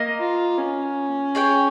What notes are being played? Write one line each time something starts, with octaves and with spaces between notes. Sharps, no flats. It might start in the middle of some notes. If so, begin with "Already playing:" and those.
Already playing: A#3 A#4 D#5
F4
C#4
G#4 C#5 G5